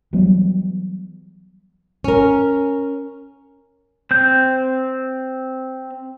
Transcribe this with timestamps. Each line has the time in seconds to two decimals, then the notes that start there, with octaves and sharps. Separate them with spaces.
0.13 E3 F#3 G3 B3
2.04 C#4 A#4
4.11 C4 G6